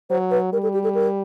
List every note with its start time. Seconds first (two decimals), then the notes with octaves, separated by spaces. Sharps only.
0.10 F#3 C5
0.31 B4
0.52 G3 A#4
0.63 A4
0.74 G4
0.84 A4
0.95 A#4